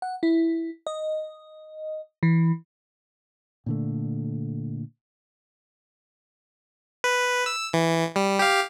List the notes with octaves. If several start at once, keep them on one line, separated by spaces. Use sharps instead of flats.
F#5
E4
D#5
E3
A#2 D3 A3
B4
E6
E3
G3
G4 F5